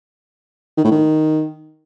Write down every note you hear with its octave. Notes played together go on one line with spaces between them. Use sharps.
D#3
A2
D#3